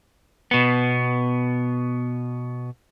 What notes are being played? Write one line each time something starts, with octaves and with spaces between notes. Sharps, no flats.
B2 B3